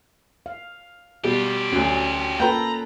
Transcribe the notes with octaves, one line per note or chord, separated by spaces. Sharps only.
F5
B2 G3 F4 G4
D2 F#3 C#4
A#3 F4 A4 B4 G5 A#5